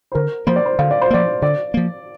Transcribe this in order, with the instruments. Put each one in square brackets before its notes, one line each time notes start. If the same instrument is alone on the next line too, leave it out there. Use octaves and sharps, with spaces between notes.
[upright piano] C5
[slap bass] D3 [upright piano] A#4
[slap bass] F3 A#3 [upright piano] C5
[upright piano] D5
C5
[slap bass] D3 [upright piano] F5
[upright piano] D5
C5
[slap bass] F3 A#3 [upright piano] D5
[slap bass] D3 [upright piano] D5
[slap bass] F3 A#3